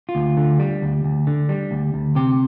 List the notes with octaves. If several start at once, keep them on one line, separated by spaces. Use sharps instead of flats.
F4
D2
D3
G3
D2
D2
D3
G3
D2
D2
C3 G4